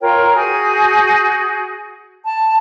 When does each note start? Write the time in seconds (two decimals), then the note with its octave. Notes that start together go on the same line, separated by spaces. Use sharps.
0.01 F4 A#4 C#5 G5
0.35 F#4 G#4 G#5 G6
2.24 A5